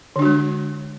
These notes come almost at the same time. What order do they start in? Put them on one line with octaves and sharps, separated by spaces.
D3 D4 F#4 G#3